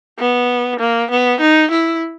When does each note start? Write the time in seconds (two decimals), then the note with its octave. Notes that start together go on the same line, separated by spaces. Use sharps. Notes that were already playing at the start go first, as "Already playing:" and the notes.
0.19 B3
0.80 A#3
1.11 B3
1.41 D#4
1.71 E4